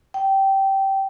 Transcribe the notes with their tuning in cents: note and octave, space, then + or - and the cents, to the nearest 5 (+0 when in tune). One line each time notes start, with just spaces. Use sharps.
G5 -15